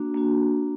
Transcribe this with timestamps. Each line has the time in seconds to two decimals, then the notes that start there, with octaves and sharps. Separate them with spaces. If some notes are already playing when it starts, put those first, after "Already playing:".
Already playing: A#3 D4 F#4
0.14 A#3 D4 F#4